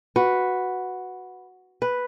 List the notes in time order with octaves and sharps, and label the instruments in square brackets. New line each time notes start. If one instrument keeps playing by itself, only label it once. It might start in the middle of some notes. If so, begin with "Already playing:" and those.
[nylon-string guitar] F#4 [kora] B4
[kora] B4